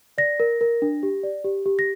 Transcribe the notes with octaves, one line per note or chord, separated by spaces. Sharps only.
D5 A#6
A#4
A#4
D4
G4
D5
G4
G4
A#6